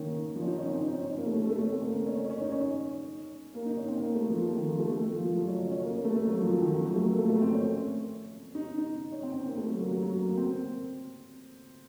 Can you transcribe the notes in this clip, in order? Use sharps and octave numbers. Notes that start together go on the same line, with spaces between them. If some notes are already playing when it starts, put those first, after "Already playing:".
Already playing: D#3 A#3 C#4 D#4
F3
C#4
D#4
C#4
C4
D#4
C#4
D#4
C#4
A#3
A3
A3
A3
C#4
C4
A#3
A#3
C#4
C#4
C#4
D#4
C#4
A#3
D#4
C#4
C4
A#3
A3
F3
A3
D#3
F3
A3
A3
F3
F3
F#3
C#4
C#4
C#4
A#3
A#3
A3
A3
F#3
F3
F3
D#3
F3
F#3
A3
A#3
A3
A3
C4
C#4
D#4
D#4
C#4
C4
C4
A#3
A3
F#3
A#3
F#3
F#3
A#3
C4